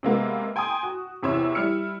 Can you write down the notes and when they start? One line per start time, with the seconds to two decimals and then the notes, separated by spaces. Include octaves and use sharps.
0.03 C3 G#3 A#3 B3
0.56 G5 G#5 A#5 C6 D#6
0.83 F#4
1.23 E2 C3 E4 C#5 E6
1.55 G3 E4 F6 C#7